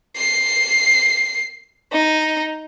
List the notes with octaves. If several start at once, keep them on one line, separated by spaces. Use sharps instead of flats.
C7
D#4